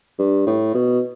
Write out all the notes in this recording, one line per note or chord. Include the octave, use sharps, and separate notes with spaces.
G2
A2
B2